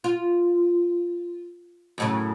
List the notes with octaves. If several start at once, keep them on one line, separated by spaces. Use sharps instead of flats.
F4
F#2 A2 C#3